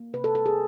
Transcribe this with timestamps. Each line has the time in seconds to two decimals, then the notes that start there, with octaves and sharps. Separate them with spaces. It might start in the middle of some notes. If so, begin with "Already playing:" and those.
Already playing: A#3
0.13 C3 B4
0.24 A4
0.35 G3 A4
0.46 G#4